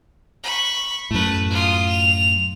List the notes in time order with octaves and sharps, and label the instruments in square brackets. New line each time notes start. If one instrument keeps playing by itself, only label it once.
[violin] B5 C#6
[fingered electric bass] F#2 A2 [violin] A3 B4
[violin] F4 D#6
F7